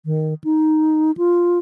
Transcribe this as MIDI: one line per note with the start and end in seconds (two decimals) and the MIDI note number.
0.05 0.34 51
0.44 1.11 63
1.17 1.59 65